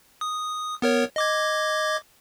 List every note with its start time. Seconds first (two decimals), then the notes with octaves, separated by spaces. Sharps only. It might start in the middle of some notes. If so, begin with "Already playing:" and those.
0.21 D#6
0.82 B3 A#4 C#5
1.16 D#5 D6 G#6